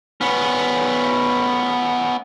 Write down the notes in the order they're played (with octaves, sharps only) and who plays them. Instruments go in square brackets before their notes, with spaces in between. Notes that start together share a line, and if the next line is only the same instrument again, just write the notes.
[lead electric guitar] B3 C#4